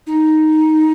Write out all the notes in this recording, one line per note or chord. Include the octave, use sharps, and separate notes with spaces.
D#4